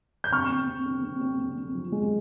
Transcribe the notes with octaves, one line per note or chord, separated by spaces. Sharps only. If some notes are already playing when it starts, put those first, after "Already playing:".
G6
C4 C#6 F6
C4
C4
C4
C4
C4
C4
C4
F3
G#3